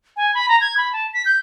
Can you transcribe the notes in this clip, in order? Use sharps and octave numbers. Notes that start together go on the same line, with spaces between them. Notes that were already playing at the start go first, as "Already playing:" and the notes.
G#5
B5
A#5
G#6
B5
A5
B6
G6